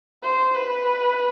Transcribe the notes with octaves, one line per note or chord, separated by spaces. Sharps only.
C5
B4